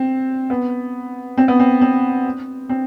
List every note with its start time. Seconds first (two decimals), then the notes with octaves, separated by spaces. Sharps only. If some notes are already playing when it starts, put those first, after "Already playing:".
Already playing: C4
0.50 B3
1.37 C4
1.48 B3
1.59 C4
1.81 C4
2.69 C4